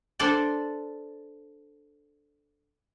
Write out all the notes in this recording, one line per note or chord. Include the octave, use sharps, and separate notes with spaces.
D4 A4 C5 D5